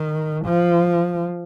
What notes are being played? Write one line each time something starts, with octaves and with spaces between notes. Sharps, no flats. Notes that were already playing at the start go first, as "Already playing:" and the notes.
Already playing: D#3
F3